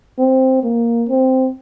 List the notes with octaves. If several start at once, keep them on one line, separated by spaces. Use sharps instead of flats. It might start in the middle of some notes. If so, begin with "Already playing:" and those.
C4
A#3
C4